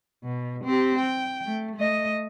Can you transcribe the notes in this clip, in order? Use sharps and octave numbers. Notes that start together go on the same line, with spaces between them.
B2
C4 G4
G5
A3
A3 D#5